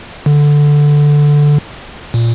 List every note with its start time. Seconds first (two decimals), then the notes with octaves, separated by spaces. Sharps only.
0.26 D3
2.14 A#2